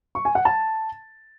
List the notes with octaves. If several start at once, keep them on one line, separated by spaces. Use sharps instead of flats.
C#6
G#5
F#5
A5